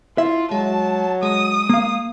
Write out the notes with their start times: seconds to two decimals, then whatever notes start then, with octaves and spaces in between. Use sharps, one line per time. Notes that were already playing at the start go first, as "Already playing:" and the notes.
0.18 E4 F4 E5
0.51 F#3 G#3 A5
1.23 G#3 D#6
1.69 A#3 F5